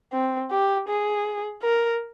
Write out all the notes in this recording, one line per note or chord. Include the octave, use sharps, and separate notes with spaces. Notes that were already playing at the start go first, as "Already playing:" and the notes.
C4
G4
G#4
A#4